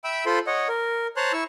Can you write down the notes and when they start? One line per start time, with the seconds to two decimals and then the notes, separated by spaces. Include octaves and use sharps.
0.04 E5 G5 B5 E6
0.26 F4 A4 C5 B5 C6
0.47 C#5 D#5 F#5
0.68 A#4
1.17 C5 C#5 A5 A#5 C6 F#6
1.33 E4 C#6 E6